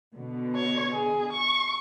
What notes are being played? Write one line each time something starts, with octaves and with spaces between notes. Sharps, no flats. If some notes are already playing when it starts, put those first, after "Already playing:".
B2 D3
C#5
G#4
C#6